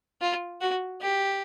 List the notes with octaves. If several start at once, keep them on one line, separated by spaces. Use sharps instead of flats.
F4
F#4
G4